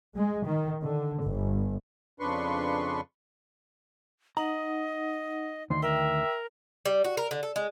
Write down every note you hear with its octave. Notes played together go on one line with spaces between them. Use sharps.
G#3
D#3
D3
G1
F2 C#3 D4 B4 C6 C#6
D#4 D#5 F#5 A#5
D2 D#3 C6
A#4 E5 G5
G3
F#4
A#4
D3
A4
G#3